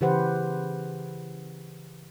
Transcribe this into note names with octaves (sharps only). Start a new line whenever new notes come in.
C#3 E3 G4 B4 C5 F#5